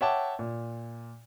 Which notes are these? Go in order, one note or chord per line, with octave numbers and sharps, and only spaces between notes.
C#5 E5 F#5 G5 A5 D6
A#2